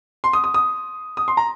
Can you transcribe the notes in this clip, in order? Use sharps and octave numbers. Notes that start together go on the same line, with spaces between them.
C6
D#6
D#6
D#6
D#6
C6
A#5